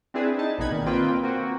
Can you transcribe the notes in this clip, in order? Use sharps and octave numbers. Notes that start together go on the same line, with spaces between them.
C4 D4 E4 G#4 B4
D#4 A5
A#1 B2 B3 D#4 B5 G#6
A#2 D#3
A#3 C4 F4 B4 G5
A#3 C4 F#4